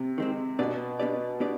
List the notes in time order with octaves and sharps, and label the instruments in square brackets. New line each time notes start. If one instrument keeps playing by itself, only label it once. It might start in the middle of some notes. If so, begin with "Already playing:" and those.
Already playing: [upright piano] C3
[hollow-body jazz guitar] D#3 G#3 C4
[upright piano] B2 [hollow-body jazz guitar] B3 D4 G4 B4 D5
[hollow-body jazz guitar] B3 D4 G4 B4 D5
B3 D4 G4 B4 D5